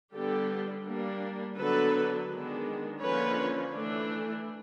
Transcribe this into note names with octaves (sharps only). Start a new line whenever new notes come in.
D3 G3 B3 D4 G4 A4
G3 A#3 D4
D3 F#3 B3 D4 A4 B4
D#3 G#3 B3 D4
D3 F3 A#3 C#4 B4 C#5
E3 A3 D4